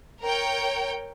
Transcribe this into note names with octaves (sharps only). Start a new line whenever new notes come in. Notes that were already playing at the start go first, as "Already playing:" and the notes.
A#4 C#5 G5